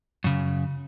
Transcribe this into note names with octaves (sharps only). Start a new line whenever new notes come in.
F#2 C#3